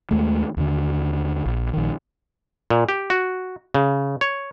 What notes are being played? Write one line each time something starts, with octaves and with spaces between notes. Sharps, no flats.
D#2 G#3 A3
D#2 D3
A#1
A#1 D#3
A#2
G4
F#4
C#3
C#5